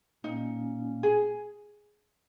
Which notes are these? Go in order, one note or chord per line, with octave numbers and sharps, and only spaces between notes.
A#2 A#3 C#4 D#4
G#4